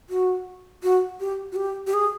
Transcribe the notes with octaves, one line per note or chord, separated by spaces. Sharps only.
F#4
F#4
G4
F#4
G4
G4
G#4